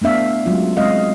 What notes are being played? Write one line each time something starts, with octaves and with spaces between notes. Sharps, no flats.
A3 B3 D4 E5 F5
F#3 G#3 C#4 F4
G#3 C4 D#5 F5